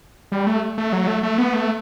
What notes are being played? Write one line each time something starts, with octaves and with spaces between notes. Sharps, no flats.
G3
A3
A3
F#3
A3
A3
B3
A3